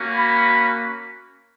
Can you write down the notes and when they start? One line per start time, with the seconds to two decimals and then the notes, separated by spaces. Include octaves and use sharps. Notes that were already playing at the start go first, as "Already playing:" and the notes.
Already playing: A#3 C#4 F#4
0.15 B5